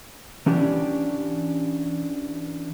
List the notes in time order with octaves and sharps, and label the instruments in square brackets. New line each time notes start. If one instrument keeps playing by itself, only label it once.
[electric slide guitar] E3 C#4 D4 G4 D5